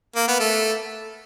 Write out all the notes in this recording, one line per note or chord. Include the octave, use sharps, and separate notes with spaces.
A#3
B3
A3